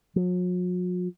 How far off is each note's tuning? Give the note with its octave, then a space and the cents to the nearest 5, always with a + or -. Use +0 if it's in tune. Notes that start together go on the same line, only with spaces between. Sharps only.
F#3 -45